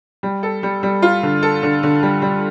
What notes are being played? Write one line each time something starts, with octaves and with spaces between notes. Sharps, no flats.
G3
A4
G3
G3
F4
D3
A4
D3
D3
G3
G3